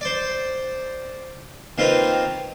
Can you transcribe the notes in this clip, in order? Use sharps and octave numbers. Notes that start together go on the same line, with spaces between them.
C5 D5
D#3 A#3 C4 F4 B4